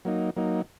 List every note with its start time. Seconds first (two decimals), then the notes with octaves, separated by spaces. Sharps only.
0.05 F#3 A#3 D#4
0.36 F#3 A#3 D#4